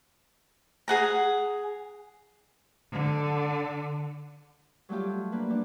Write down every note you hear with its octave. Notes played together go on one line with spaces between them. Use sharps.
G#4 F#5 A#5
D3
F#3 G3 A3 F4 G4
A#3 D4 B4
G3 D4